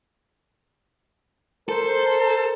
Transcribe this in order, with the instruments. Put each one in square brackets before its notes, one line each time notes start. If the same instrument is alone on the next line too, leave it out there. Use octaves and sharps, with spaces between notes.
[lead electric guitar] A4 [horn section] A#4 C5